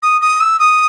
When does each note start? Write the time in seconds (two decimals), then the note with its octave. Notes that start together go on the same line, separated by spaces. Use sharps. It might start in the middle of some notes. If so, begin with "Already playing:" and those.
0.02 D#6
0.21 D#6
0.40 E6
0.59 D#6